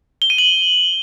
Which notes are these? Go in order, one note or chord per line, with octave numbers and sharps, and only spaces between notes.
G7
D#7
F#7